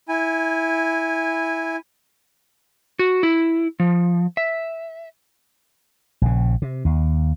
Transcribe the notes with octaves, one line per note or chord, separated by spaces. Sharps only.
E4 G#5
F#4
E4
F3
E5
A#1 C#3
C3
D#2